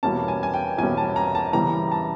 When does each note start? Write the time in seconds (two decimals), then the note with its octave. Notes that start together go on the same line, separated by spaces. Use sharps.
0.03 E2 B2 G3 A#3 C#4 A5
0.28 G#5
0.43 G#5
0.54 G5
0.78 E2 B2 G3 A#3 C#4 G#5
0.97 A5
1.16 A#5
1.35 A5
1.53 E2 C#3 E3 G3 A#5
1.92 A5